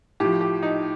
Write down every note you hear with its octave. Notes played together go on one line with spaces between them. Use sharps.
A2 F3 G4
G4
D#4